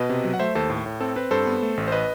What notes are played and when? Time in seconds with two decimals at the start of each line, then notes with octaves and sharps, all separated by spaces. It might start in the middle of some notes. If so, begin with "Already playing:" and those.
Already playing: B2 B4 D#5
0.09 C3
0.24 F#3
0.34 F#5
0.39 A3 C5 E5
0.55 D#2 A4 C5
0.70 A2
0.86 A2
1.00 C4 A4
1.16 C4 B4
1.31 G2 A4 C5
1.47 B3
1.62 A3
1.77 A1
1.88 C5
1.92 B4 D#5